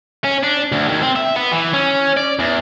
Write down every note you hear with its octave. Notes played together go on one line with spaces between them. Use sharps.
C#4
D4
D2
D#2
C4
E5
B3
E3
C#4
D5
E2